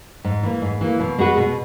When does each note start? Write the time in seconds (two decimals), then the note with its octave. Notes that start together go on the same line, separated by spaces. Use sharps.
0.24 G#2
0.43 E3 A#3
0.62 G#2
0.81 E3 A#3
1.00 B2
1.18 G#3 B3 F#4 B4
1.37 B2